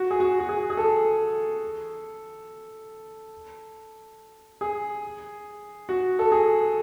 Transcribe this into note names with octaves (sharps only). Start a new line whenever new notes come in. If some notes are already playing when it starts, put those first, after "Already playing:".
Already playing: F#4
G#4
F#4
F#4
G#4
G#4
A4
G#4
F#4
A4
G#4